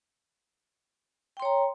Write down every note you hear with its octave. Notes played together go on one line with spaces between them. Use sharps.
C#5 G5 A#5 C6